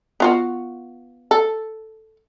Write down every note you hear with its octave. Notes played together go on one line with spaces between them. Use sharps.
B3 F4 F#4
A4